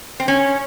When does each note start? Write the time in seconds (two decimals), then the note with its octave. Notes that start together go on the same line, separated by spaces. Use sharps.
0.20 C4
0.28 C#4